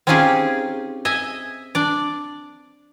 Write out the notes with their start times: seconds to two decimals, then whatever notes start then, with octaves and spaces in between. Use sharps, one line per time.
0.07 C4 C#4 D#4 F4 G4 G#4
1.05 D#5 E5 G#5
1.75 D4 D5